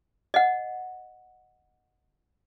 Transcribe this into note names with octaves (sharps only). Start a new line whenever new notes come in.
D#5 F#5